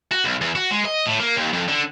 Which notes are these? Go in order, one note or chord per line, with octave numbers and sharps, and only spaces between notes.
F#4
B1
E2
F#4
G#3
D#5
A2
A#3
D#2
F2
D3